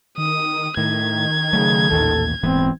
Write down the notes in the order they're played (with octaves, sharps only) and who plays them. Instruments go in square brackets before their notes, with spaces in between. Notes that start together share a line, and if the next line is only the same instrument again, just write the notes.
[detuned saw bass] D#3 [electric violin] D#6
[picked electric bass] A2 [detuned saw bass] D#3 [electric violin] G#6
[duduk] C#3 [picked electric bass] F#3 A3
[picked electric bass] A1 D#2 A#2 [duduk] A4
[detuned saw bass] D#1 [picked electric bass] G#2 E3 B3 [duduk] C4